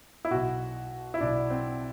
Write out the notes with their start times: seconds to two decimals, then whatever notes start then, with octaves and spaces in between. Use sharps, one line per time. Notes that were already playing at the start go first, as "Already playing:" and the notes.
0.25 E4
0.30 B1 B2 F#4
1.14 E4
1.21 B1 B2 D4
1.50 C4